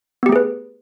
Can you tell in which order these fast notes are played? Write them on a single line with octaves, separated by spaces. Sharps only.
B3 G4 A3 G#4 B4